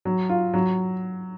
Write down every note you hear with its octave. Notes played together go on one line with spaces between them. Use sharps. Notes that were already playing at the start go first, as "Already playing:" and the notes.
F#3
F4
F#3